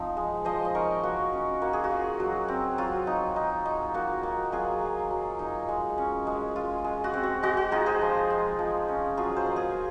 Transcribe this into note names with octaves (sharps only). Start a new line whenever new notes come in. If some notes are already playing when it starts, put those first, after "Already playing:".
Already playing: F3 C4 D#4
G#3
F3 C5 D#5
D#5
D#4 A#4 C#5
A#3 F#4
C#4
A#3 F#4
G#4
F#4
F4
F#3
C4
F#3 F4
D#4
D#4
D#4
A#3 F#4
A#3
F#3 F4 G#4
A#3
F#3
D#4
G#3
C#4
G#3
F4
G#3
F#4
C4
F#4
G#3 F#4
F#4
D#4 F4 G#4
G#4 C5
F3
G#3
F3
C#4
F#3 F4 G#4
G#4 C5
A#3
F4 G#4